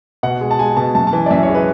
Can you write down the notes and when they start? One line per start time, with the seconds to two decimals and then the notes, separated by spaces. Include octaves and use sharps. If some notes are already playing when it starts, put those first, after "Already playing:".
0.23 B2 F#5
0.41 G#3
0.51 A5
0.59 G#3 G#5
0.77 B2 A5
0.95 F#2 A5
1.07 A5
1.13 E3
1.26 D5
1.31 F#2 E5
1.43 C#5
1.49 G#3
1.55 B4